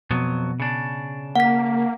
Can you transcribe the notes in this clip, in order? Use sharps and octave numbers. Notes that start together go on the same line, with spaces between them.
F2 B2 F#3 B3
C#3 D4
A#3 F#5 B6